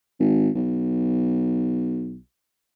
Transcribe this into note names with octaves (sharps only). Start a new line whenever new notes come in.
G#1
B1